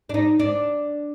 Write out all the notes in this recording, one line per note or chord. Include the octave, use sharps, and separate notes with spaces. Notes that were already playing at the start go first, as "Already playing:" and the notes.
D4
D#4
D4